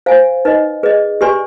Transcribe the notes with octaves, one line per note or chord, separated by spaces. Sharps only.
C5 F5 G#5
D#4 B4 D#5
G#4 B4 D#5
G4 B4 D5 G#5 C6